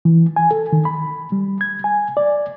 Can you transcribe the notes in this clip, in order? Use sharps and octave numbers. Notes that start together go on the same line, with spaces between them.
E3
G#5
A4
D#3
B5
G3
G#6
G#5
D5